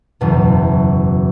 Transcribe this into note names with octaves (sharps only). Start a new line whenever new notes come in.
F#1 E2 B2